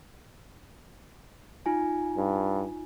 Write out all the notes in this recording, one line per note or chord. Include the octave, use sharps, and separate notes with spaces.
D#4 F4 G#5
G2